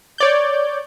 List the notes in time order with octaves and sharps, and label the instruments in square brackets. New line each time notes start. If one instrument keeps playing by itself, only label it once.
[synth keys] C#5 D5 G6